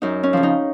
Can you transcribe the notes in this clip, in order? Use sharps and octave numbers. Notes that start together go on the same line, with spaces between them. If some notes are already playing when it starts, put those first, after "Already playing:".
F#2 D#4
C#4
C#3 F3
D#4